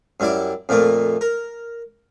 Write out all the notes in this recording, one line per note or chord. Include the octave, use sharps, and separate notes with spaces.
F#2 G3 E4 D6
F2 A#2 A3 A#3
A#4